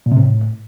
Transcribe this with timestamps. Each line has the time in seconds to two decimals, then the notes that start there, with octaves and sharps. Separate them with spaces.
0.06 A#2
0.12 C3
0.17 A2